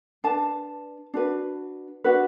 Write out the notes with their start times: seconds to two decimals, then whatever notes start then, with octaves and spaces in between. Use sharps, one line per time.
0.24 D4 B4 A5
1.14 D4 F#4 B4
2.04 D4 F#4 B4